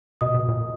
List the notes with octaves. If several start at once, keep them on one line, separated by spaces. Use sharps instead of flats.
B2 D#5 D#6
B2
A#2